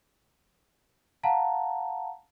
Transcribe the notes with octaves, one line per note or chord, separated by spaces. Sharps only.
F5 F#5 A5 A#5